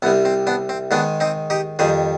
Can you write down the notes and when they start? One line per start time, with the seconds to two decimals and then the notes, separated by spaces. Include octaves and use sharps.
0.02 C2 C3 G3 B3
0.25 C4
0.47 B3 D4
0.69 C4
0.91 G#2 D#3 G#3 B3 D4
1.20 C4 D#4
1.50 D#4 G4
1.79 F2 D#3 G3 G#4 C5